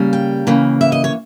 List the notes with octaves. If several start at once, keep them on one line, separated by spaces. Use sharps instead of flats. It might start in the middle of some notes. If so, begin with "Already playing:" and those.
Already playing: C#3 G3 A#3
G5
C#3 E3 A#3
E5
D#5
C#5